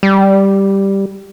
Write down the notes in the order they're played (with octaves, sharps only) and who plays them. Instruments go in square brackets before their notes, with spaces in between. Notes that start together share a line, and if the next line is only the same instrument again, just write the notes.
[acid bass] G3